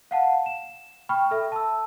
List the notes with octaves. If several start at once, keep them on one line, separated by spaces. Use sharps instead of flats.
F5 F#5 A5
E7
G5 B5 C#6 F6
A4 E5
A5 E6